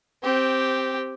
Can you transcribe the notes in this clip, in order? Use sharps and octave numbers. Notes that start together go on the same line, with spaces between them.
C4 G4